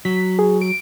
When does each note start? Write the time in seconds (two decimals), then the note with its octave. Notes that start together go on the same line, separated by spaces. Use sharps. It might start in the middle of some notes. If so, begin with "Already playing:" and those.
0.05 F#3 B6
0.39 G#4
0.62 D7